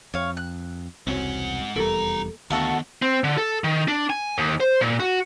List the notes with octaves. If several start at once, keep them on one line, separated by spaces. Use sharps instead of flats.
F2 C#5 F5
F#6
E1 C2 G#2 C4 C#4 F#4 F#5
F1 E2 G3 A#3 E4 A4 A#4 A#5
D2 D#3 B3 F#4 A4 F5 F#5 A#5
C4
D3
A4
D#3
D4
G#5
D#2
C5
A#2
F#4